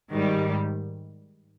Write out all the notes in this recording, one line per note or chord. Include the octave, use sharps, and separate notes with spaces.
G#2 D#3 G3